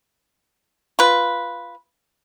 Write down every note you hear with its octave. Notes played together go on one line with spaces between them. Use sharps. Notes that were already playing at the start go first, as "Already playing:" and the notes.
F4 B4